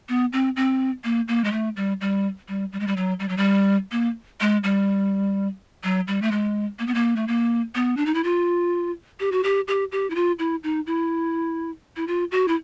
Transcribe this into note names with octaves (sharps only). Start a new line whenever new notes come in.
B3
C4
C4
A#3
A#3
G#3
A3
G3
G3
G3
G3
G#3
G3
F#3
G3
F#3
G3
A#3
G#3
G3
F#3
G3
A3
G#3
A#3
B3
A#3
A3
A#3
B3
D4
D#4
E4
F4
G4
F#4
G4
G4
G4
E4
F4
E4
D#4
E4
E4
F4
F#4
E4